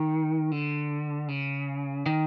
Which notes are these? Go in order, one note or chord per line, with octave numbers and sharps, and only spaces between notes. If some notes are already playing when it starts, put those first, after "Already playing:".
Already playing: D#3
D3
C#3
D#3